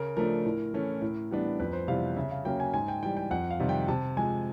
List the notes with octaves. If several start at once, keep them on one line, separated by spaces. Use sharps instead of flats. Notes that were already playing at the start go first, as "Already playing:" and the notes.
Already playing: C#3 A#4
F3 A3 D4 A#4
A2
E3 A3 C#4
A2
E3 G3 B3 D4
F2 B4
C5
C3 E3 G3 B3 F5
C#3 E5
F5
F#3 A#3 C#4 G5
G#5
G#2 G#5
G5
E3 G3 G5
G5
F2 F#5
F5
C3 D#3 G3
G5
C3 A5
F3 G#3 G#5